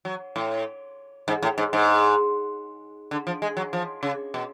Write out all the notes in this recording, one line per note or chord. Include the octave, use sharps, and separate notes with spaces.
F#3
A2
G#2
A2
G#2
G#2
D3
F3
G#3
F#3
F3
C#3
B2